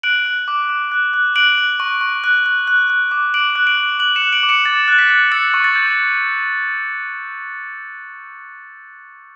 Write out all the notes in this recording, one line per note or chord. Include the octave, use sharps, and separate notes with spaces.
F#6 D7 F#7
F#6
D6
D6
F#6
F#6
F#6 D7 F#7
F#6
C#6
C#6
F#6
F#6
F#6
F#6
D6
D6 D7 F#7
F#6
D7 F#7
F#6
F#6 D7 F#7
C#7 E7
F#6
D7 F#7
D6
C#7 E7
D6 A6
F#6 A6
B6
F#6
E6 A6 C#7
C#6
A6
G6